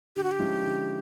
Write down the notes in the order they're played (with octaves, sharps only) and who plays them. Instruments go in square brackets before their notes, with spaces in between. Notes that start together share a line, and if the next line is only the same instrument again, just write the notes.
[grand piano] D3 [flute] G4
[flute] F#4
G4
[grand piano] F3 G#3 C#4 E4
D3